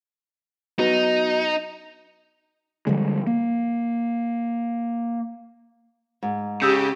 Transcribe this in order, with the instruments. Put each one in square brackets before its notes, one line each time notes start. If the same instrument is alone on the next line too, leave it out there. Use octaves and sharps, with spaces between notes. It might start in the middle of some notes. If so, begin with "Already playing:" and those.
[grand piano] F#3 B3 [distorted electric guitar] D#4
[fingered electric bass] D3 F3 G3 G#3
A#3
[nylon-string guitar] G#2
[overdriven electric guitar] C#3 [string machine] G4 [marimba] D#6 E6 G6